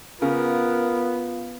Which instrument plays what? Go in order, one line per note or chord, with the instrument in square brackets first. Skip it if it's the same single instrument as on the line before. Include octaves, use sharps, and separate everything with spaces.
[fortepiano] C#3 [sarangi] B3 [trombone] F4 [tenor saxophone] A#4